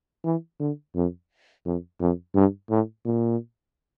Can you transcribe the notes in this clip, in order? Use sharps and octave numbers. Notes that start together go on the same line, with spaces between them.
E3
D3
F2
F2
F2
G2
A2
A#2